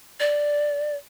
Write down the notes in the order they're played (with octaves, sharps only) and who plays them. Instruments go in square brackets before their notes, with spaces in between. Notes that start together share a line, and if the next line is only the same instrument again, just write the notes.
[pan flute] D5